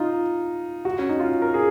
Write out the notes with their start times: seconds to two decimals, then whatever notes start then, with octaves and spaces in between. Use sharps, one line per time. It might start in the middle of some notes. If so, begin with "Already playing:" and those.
Already playing: D#4 F4
0.85 F#4
0.99 C#4
1.09 D#4
1.20 F4
1.42 A#4
1.54 G#4